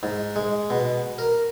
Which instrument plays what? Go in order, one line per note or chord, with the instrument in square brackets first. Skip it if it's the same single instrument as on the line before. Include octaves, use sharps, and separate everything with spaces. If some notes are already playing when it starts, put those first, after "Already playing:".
[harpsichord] G#2
G#3
B2
A#4